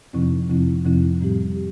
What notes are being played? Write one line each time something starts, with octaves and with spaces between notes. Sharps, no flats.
F2 C3 F3 C4 E4
F2 C3 F3 C4 E4
F2 C3 F3 C4 E4
A2 G3 C4 G4
G4